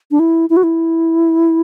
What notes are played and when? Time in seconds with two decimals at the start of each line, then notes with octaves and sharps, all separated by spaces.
0.11 D4
0.19 E4
0.50 E4
0.57 F#4
0.63 E4